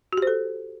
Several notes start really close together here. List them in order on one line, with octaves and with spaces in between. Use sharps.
F#4 G4 C5 A4